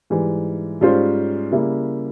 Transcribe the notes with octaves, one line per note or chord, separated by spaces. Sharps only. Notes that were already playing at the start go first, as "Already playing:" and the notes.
G#2 E3 G3
G#2 G3 C#4 F4 C5
C#3 G3 A#3 E4